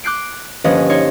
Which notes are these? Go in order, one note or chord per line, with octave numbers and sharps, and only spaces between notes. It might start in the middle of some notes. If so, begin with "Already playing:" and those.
D6 F#6 G6 C7 D7
G1 F3 A#3 C#4 B4 D#5
D#4 C#5 C6